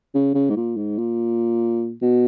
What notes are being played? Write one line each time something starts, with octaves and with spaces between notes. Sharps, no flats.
C#3
C#3
G#2
A#2
G#2
A#2
B2